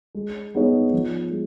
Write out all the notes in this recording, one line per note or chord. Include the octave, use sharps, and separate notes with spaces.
G#3
B3 D#4 G#4 C#5
F3
G#3